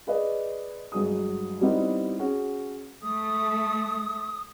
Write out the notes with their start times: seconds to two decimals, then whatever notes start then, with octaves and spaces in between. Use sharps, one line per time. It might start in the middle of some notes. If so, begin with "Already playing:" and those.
0.07 G#4 B4 D5 D#5
0.92 G1 F#3 G#3 D#6
1.61 G3 B3 C4 D#4 E4
2.19 C#4 F#4 G#4
3.03 A3 D#6